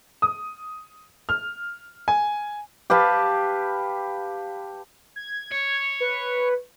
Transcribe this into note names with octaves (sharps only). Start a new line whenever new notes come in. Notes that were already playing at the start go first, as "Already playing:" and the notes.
D#6
F6
G#5
G4 B4 F5 A5
G#6
C#5
B4